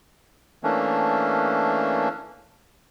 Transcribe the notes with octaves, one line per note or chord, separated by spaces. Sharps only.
E3 A3 A#3 C#4 D4